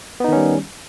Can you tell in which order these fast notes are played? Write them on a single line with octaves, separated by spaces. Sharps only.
B3 D#4 D#3 C#4 G3